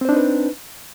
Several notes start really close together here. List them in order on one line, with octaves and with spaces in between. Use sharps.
C4 C5 D4 D#4 B4